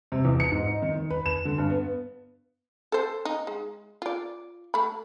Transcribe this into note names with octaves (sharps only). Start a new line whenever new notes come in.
C3
E2
C#7
G#2
D#4
D#3
D#3
B4
E7
D3
G2
B3
A4 C5
D#4
G#3
F4 D5
A3 B5